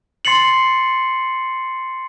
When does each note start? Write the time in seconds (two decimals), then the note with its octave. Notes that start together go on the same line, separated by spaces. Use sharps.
0.25 C6 A6 C7 C#7 F#7